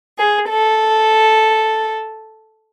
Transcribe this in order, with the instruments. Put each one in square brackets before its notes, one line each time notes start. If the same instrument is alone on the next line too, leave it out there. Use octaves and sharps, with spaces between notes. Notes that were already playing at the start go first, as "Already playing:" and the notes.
[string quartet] G#4
A4